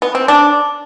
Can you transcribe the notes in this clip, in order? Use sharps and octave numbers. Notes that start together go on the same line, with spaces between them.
B3
C4
D4